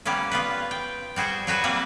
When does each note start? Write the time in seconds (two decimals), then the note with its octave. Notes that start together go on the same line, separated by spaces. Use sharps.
0.05 G3 A#3 B3 C#4
0.31 B3 F4 B4
0.71 G5
1.16 G3 F#4 G#4 C5
1.47 F#3 F#4 B4 G#5
1.64 G3 A#3 C4 B4